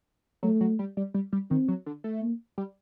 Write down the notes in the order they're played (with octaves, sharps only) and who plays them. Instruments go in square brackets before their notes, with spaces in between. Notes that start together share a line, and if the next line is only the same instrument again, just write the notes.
[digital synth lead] F#3 [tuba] A3
[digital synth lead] F#3
G3
G3
G3
G3
[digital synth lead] D#3 [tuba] C4
[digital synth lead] F#3
D3
A3
[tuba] A#3
[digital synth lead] G3